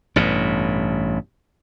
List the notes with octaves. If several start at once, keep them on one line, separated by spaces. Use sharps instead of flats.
A1 G2 B2